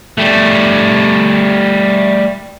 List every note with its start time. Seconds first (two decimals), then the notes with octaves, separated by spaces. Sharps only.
0.18 G3 A3